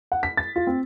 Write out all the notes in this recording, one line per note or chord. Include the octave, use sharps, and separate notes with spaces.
F#5
B6
A6
F4
C4